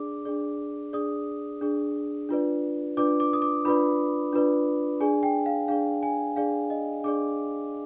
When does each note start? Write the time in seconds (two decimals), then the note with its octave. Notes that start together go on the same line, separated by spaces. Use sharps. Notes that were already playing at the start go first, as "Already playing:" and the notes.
Already playing: D4 G#4 D5 D6
0.25 D4 G#4 D5
0.93 D4 G#4 D5 D#6
1.61 D4 G#4 D5
2.29 D4 F4 B4 D5
2.97 D4 F4 B4 D5 D6
3.20 D6
3.33 D#6
3.42 D6
3.65 D4 F4 B4 D5 B5
4.33 D4 F4 B4 D5
5.00 D4 G#4 D5 G#5
5.23 G5
5.46 F5
5.68 D4 G#4 D5 F5
6.03 G#5
6.36 D4 G#4 D5 F5
6.70 D#5
7.04 D4 G#4 D5 D6